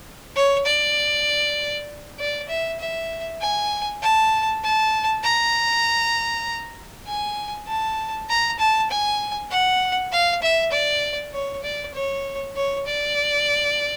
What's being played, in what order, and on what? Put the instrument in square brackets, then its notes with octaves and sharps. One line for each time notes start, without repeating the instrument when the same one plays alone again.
[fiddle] C#5
D5
D5
E5
E5
G#5
A5
A5
A#5
G#5
A5
A#5
A5
G#5
F#5
F5
E5
D5
C#5
D5
C#5
C#5
D5